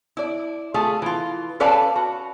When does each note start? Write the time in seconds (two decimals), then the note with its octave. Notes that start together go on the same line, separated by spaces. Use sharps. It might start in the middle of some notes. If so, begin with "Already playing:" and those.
0.17 E4 D5
0.74 A3 F4 G#4
1.02 E3 F4
1.60 C#4 A4 B4 D5 F5 A5
1.96 F#4